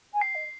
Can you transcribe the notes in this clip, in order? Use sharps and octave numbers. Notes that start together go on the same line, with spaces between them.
G#5
G5 C7
D#5